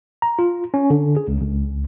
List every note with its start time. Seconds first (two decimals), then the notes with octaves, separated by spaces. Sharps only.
0.22 A#5
0.39 F4
0.74 C#4
0.90 D3
1.17 G#4
1.28 C#2
1.40 C#2